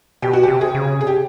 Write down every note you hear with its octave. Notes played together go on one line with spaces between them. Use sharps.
B2 G4
F#4
C3 G4
G#4
C#3
C3 G#4
G4